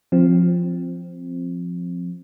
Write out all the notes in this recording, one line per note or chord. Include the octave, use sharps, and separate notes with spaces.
F3 C4